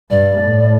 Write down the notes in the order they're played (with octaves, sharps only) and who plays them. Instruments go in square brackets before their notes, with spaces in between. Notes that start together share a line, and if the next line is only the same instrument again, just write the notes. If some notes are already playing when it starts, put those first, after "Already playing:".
[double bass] G2 [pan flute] D5
[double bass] A2